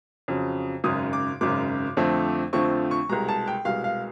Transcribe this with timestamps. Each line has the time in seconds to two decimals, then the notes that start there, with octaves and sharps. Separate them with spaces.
0.28 F2 C#3 F#3
0.84 G#1 F#2 C#3 D#6
1.13 D6
1.41 G#1 F#2 C#3 D6
1.97 F2 D3 F3 A3 C4
2.53 F2 D3 F3 A3 C4 C#6
2.91 C#6
3.09 C2 B2 G#3 A#5
3.29 A5
3.48 G5
3.65 C2 B2 G#3 F5
3.84 F5